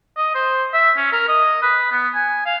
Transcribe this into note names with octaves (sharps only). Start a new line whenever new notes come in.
D#5
C5
E5
C#4
A#4
D#5
B4
B3
G#5
F5